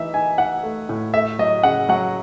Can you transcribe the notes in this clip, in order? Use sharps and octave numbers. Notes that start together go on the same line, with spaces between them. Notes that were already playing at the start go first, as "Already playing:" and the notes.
Already playing: E3 D#4 E5
D#4 G#5
D#4 F#5
A3
A2
A3 E5
F#3 D#5
C#3 F#5
F#3 F#5